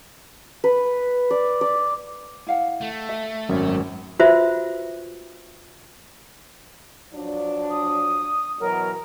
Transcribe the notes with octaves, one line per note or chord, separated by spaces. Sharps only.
B4
D5
D5
E4 F5 F#5
A3
E5
G#1 F#2 C#4
F4 F#4 B4 C5 E5
F3 F#3 D4
D#6
B2 E3 F#3 A#4